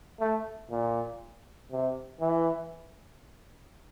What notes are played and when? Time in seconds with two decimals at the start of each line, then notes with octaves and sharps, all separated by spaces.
0.20 A3
0.70 A#2
1.71 C3
2.20 E3